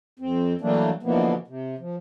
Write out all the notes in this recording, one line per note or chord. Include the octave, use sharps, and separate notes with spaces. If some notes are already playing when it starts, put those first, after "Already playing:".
F2 C4
E3 F#3 G3 A3 A#3 D4
B2 D3 E3 F3 A#3 B3
C3
F3